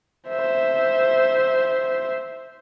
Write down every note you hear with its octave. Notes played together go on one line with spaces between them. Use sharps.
C5 E5